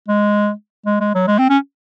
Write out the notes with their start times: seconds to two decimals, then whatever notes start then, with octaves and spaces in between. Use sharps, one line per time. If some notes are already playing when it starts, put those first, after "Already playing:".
0.08 G#3
0.85 G#3
1.01 G#3
1.15 F#3
1.27 G#3
1.39 C4
1.50 C#4